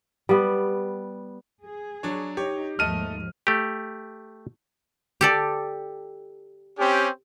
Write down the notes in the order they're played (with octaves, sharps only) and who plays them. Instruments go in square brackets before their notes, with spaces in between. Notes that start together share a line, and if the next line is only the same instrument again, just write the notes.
[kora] G3 B3
[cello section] G#4
[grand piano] F#3 D4 C#5
[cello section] D#4 [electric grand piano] G4 [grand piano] C#5
[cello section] D#2 G#2 F3 [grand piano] A3 A4 D#5 [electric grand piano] F6 D#7
[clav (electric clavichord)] A3 G4
[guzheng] G4 A4 D5
[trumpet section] C4 C#4 G4